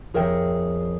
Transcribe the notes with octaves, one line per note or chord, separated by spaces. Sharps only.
F2 G#4 A#4 C#5 E5 G5